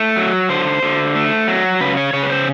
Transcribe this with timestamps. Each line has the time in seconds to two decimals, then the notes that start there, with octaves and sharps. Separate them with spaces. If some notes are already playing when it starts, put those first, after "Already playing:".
Already playing: A3 C#5
0.16 F#3
0.49 D3 C5
0.83 D3
1.15 A3
1.48 F#3
1.81 C#3 B4
1.97 C#5
2.13 C#3 C#5
2.23 B4
2.30 C5